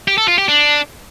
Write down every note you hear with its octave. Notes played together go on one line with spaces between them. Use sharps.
G4
A4
F4
G4
D4